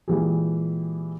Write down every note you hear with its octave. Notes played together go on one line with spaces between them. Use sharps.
A#2 E3 G#3 G4 G#4